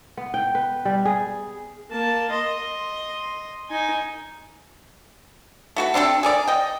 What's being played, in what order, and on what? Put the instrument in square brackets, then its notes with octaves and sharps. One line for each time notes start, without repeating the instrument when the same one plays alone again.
[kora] B3
G5
B4
G3
G#4
[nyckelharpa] A#3 A5
D#5 C6
D#4 G#5
[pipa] A3 F#4 B4
C4 D4 G4 A4
G#4 A#4 D5
D#5 G5